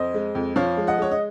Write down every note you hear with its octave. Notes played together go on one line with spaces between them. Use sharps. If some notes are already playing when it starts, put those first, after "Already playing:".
Already playing: F2 C5 D#5
G#3
F2
F3 C#5 F5
G#3
D#5 F#5
G#3 C#5
D#5